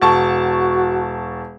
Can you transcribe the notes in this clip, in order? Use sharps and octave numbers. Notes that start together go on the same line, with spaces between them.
E1 F#4 A5 C#6